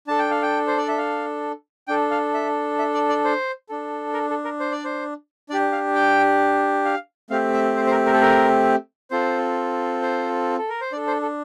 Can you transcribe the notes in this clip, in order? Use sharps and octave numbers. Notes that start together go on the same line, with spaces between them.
D4 A4 A5
G5
F5
G5
C5
D5
E5
F5
D4 A4 G5
F5
E5
E5
D5
D5
C5
D4 A4
A#4
A4
A#4
C5
D5
C5
D4 G4 D5
F5
G5
F5
A3 C4 G4 F5
E5
C5
C5
A#4
A#4
A4
A#4
C4 F4 A4 C5
C5
A4
A#4
C5
D4 A4 D5
C5
A4